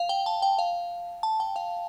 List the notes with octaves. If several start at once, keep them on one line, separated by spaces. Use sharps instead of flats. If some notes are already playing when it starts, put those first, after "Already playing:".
Already playing: F5
G5
A5
G5
F5
A5
G5
F5